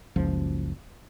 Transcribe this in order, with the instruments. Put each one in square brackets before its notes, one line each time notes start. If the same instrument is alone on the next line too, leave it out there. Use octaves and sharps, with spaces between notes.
[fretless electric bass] F#1 C#2 F3